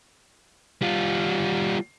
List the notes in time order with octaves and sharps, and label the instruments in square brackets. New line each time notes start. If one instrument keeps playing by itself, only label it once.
[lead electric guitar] G3 F4